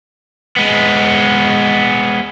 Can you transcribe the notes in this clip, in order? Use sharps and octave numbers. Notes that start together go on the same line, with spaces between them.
G#3 B3